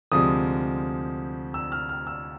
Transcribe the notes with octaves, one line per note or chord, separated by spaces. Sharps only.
D2 C3 F3 G#3 D#6
E6
F6
F6
E6